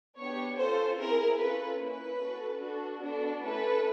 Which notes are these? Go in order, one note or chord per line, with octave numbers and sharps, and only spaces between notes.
B3 D4 G4 C#5
C#4 F4 A4 C5
C4 E4 G#4 A#4
C#4 F4 A4 B4
A#3 C#4 E4 B4
C#4 F#4 A4
D4 F#4 A4
B3 D4 F#4 A4
A3 C#4 E4 A4 B4